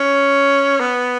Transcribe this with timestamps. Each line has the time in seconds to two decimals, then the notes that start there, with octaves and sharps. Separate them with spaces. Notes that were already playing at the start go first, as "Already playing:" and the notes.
Already playing: C#4
0.80 B3